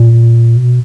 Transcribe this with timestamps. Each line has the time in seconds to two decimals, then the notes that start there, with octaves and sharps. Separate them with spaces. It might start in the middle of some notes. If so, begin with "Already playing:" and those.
Already playing: A#2
0.57 B2